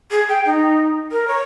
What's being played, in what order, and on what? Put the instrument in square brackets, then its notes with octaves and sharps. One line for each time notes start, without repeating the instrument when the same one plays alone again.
[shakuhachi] G#4
G5
D#4
A#4
C#5